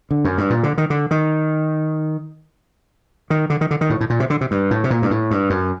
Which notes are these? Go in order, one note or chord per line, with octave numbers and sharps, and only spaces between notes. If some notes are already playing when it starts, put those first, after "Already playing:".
D3
F#2
G2
A#2
D3
D#3
D3
D#3
D#3
D3
D#3
D3
D#3
A2
A2
A#2
C3
D3
C3
G2
A2
C3
A#2
G2
A2
G2
F#2